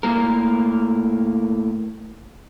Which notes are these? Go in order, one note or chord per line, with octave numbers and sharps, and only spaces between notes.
A2 A#3 A#4